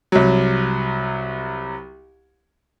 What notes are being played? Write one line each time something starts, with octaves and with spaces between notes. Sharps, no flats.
C2 F#3